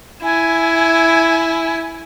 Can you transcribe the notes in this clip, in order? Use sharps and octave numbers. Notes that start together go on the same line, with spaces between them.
E4 G#5